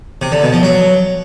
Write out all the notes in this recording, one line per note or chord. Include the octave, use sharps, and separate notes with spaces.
C3
D3
B2
F3
F#3